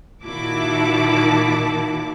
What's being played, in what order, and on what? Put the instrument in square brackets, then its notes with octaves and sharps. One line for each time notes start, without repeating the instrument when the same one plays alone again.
[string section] A#2 D#3 E4 F#4 A5 D6